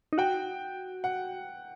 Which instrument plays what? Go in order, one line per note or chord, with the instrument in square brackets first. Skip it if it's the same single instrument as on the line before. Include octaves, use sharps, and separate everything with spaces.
[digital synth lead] D#4
[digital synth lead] F#4 [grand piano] G5
[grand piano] F#5